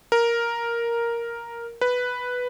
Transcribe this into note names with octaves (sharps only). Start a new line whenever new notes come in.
A#4
B4